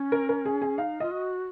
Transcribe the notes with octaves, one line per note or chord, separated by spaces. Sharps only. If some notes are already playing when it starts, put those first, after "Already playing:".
Already playing: C#4
A#4
A#4
G#4
G#4
D#4 F5
F4 D#5
F#4